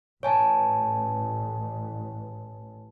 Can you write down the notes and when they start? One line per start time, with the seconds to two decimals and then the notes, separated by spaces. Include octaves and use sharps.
0.23 A1 C#5 G#5 A5